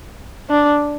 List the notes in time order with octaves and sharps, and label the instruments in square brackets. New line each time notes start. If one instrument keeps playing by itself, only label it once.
[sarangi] D4